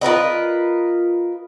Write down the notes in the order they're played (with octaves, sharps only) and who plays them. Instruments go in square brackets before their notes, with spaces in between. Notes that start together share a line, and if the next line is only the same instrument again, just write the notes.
[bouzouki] F4 A#4 B4 D#5